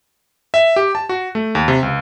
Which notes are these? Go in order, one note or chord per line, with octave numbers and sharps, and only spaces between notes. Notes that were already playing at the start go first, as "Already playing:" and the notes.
E5
G4
A5
F#4
A3
D#2
C3
C#2